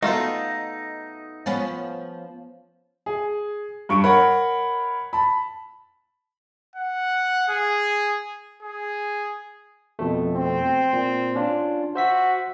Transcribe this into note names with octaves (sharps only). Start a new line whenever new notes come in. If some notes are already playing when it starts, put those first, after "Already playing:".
B2 A3 D#4 F4 A4
F3 B3 C#4
G#4
G2 C#6 D7
A#4 C#5 F#5 B5
A5 B5
F#5
G#4
G#4
F2 B2 A3
C4
A#2
C#4 D4 F4
F#4 C5 E5 B6